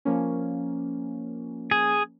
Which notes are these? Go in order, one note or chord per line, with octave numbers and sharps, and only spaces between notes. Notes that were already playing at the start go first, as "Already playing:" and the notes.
F3 A#3 C#4
G#4